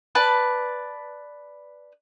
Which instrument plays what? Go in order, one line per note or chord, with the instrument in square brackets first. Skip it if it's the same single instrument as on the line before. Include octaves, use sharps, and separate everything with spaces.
[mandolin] B4 D5 A5